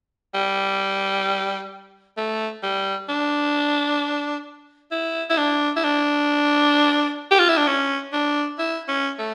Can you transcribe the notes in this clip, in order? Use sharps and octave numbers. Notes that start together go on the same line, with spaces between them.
G3
A3
G3
D4
E4
E4
D4
E4
D4
G4
F4
E4
D4
C#4
D4
E4
C#4
A3